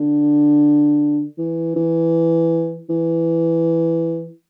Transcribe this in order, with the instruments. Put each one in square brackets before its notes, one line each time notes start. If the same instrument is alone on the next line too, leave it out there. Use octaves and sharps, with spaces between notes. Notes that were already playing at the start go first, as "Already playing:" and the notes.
Already playing: [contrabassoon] D3
E3
E3
E3